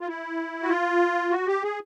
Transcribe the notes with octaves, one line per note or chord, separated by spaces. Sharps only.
F4
E4
F#4
F4
F#4
G4
G#4